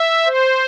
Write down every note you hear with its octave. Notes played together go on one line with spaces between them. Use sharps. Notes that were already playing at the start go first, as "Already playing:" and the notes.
Already playing: E5
C5